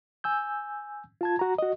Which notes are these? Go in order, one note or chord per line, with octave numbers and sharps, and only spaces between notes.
G#5 E6 G6
F4 A5 G#6
F#4 A#5
F#4 D#5